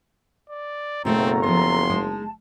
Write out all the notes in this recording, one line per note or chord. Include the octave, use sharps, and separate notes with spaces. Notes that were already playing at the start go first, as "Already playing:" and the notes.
D5
F#1 B2 A3 C4 A4 F#5 A#5
F3 B3 C6
G#3 D#4 A5